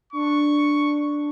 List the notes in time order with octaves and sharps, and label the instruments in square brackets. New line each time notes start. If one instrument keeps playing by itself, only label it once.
[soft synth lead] D4 [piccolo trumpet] C#6